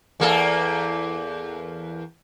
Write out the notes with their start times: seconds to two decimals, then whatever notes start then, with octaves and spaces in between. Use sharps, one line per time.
0.20 E2 A#3 A4